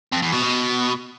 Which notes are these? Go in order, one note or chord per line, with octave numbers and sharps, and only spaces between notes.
F2
E2
B2
B2